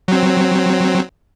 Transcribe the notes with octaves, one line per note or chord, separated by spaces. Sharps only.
F#3 C4